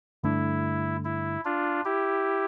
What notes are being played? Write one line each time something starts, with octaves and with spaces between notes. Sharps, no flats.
G2 D3 A3 D4 E4
E4
D4 F4
E4 G4